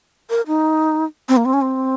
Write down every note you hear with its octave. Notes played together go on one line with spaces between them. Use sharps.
A#4
D#4
C4
A#3
C4
C#4
C4